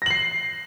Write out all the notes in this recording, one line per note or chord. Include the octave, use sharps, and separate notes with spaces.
A#6 C7 F#7